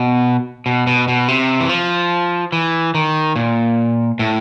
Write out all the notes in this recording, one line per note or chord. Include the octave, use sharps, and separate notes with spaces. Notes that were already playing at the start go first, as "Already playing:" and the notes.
Already playing: B2
B2
B2
B2
C3
E3
F3
E3
D#3
A#2
A2